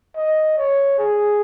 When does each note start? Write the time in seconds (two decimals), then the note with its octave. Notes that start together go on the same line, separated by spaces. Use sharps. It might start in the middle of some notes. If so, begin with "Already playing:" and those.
0.16 D#5
0.58 C#5
0.99 G#4